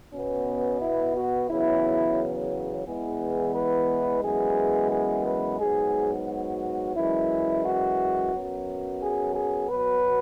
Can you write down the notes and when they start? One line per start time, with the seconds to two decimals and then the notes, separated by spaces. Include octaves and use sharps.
0.13 B2 B3 C#4
0.81 E4
1.15 F#4
1.49 E2 C#3 F#3 B3 E4
2.86 E2 E3 G#3 B3 G#4
3.55 B4
4.23 F#2 E3 G#3 B3 G#4
4.91 G#4
5.26 B4
5.60 G#2 F#3 B3 G#4
6.28 F#4
6.96 F#2 E3 G#3 E4
7.64 F#4
8.34 F#2 F#3 B3
9.01 G#4
9.36 G#4
9.69 B2 F#3 B3 B4